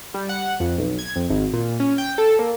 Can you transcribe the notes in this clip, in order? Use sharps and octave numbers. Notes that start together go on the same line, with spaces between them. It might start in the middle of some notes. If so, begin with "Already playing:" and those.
G3
F#5
F2
B1
G#6
F2
G#1
A#2
C#4
G5
A4
A#3